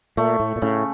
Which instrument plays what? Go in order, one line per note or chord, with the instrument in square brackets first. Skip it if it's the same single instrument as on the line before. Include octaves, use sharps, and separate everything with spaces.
[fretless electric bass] A#2 [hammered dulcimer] A3
[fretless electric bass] A2
A#2
[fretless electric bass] A2 [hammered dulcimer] C#3